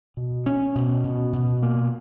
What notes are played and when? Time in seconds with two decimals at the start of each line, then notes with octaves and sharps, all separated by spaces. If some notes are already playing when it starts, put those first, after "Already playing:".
0.17 B2
0.46 C#4
0.75 B2
1.04 B2
1.33 B2
1.63 A#3